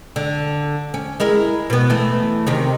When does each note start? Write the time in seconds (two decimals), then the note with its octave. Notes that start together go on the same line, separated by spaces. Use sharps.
0.16 D3
0.94 C#4
1.20 G#3 E4 A#4
1.70 B2 B3
1.90 E3 A3
2.47 C3 D#3 C#4